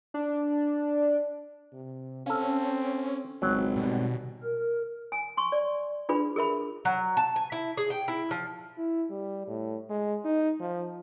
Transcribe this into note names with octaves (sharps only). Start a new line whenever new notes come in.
D4
C3
C4 C#4 A4 F5
G#1 C#2 F#3
B2 G3
A#4
G#5
C6 C#6
D5
D4 F4 G#4 B4 B5
G#4 A#4 E5 B5
F#3
A5
G#5
E4
G#4
G5
E4
F3
E4
G3
A2
G#3
D#4
F3